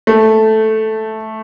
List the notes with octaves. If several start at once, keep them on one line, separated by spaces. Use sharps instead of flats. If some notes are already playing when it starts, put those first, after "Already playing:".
A3